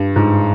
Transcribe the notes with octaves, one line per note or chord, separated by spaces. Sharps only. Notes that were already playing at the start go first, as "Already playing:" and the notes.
Already playing: G2
G#2